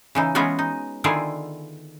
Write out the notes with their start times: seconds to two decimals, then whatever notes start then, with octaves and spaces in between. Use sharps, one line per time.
0.15 C#3 E3 D#4
0.35 E3 G#3 B3 C#4 F4 F#4
0.59 D#4
1.04 D3 D#3 E4 F4 G#4